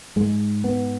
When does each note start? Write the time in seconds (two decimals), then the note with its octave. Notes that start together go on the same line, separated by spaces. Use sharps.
0.16 G#2 G#3
0.64 B3